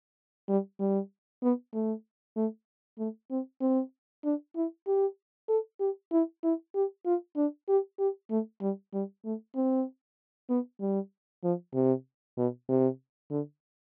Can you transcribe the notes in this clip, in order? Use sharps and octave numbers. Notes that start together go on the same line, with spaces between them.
G3
G3
B3
A3
A3
A3
C4
C4
D4
E4
G4
A4
G4
E4
E4
G4
F4
D4
G4
G4
A3
G3
G3
A3
C4
B3
G3
F3
C3
B2
C3
D3